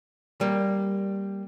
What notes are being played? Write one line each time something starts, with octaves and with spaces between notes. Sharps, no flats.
G3 A#3